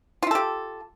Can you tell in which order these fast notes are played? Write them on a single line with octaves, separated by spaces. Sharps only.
F4 E4 A4 G4